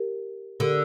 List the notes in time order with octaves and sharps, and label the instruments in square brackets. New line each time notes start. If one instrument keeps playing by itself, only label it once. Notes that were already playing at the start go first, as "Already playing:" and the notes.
Already playing: [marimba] G4 A#4
[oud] D3 [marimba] G4 A#4